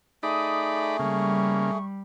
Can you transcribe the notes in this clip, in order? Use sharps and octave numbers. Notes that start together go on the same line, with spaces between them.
A3 D#4 G#4 D5 B5 D#6
C#3 G3 A#3 C#6